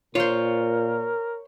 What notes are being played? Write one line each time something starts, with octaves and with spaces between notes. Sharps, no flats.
A#2 F4 A#4 C5 C#5